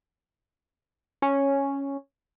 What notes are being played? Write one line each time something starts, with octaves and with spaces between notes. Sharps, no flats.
C#4